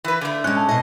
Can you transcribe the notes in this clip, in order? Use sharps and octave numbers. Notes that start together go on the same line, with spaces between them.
E3 B4
D3 A3
G#3 C#4 F#6
A5
B2 D#5